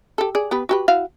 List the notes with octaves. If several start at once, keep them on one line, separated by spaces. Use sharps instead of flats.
G4 A4
G#4 D5
B3 G4 B4
F#4 G4 B4
E4 F#4 F5